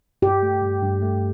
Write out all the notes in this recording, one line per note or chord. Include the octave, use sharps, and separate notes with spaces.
G2 G4
A3
G2
G2
A3